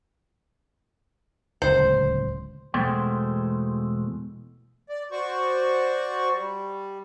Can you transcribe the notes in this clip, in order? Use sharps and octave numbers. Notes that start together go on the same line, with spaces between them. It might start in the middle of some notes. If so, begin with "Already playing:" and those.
D1 C#2 C5
E2 B2 G#3 A3 C5 G5
D5
F#4 C5 D5 C#6
G3